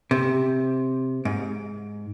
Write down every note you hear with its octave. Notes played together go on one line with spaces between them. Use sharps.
C3
G#2